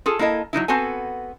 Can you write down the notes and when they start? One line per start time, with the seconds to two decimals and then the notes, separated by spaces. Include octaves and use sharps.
0.06 F4 G#4 A4
0.19 A#3 E4 A4 D#5
0.53 F#3 A#3 D#4 E4
0.68 B3 C4 F#4 A4 G#5